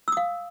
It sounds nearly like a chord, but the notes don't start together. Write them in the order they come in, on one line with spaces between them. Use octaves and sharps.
E6 D#6 F5